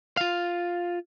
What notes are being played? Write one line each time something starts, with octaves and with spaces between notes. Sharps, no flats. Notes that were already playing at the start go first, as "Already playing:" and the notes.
F4 F5